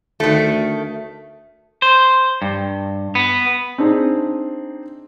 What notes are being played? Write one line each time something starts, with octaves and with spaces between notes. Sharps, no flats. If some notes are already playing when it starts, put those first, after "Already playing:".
D2 D#3 A3
C5
G2
B3
C4 D4 D#4 G#4